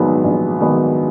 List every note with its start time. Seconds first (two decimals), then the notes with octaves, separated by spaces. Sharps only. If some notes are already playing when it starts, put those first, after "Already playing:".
Already playing: A#1 G#2 D#3 F#3 B3
0.24 A#1
0.60 G#2 D#3 F#3 B3